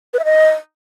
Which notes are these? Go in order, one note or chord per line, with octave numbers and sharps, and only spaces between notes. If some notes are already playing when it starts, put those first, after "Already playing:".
B4
E5
D#5